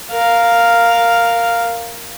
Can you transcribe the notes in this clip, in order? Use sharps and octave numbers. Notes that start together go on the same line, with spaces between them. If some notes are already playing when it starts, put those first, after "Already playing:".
A#4 F5